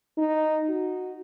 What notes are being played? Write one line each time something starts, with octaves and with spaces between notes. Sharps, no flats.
D#4
F#4